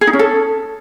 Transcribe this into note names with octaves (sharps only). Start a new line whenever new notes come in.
G#4
D#4
C#4
A4